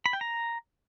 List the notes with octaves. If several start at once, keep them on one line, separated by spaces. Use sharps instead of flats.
B5
G5
A#5